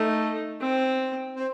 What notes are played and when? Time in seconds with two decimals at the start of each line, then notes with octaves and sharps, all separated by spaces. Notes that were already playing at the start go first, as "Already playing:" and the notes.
Already playing: A3 D#4
0.61 C4
1.37 C4